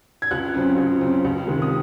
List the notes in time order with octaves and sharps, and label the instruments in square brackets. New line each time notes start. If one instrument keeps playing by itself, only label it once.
[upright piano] G#6
C#2 F#6
C#3 F#3 C4
C#2
C#3 F#3 C4
C#2
C3 D#3 G#3
D#6